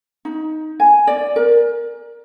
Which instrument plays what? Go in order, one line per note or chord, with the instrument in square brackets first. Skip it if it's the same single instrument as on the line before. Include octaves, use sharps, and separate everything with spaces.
[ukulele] D#4
G#5
D5
A#4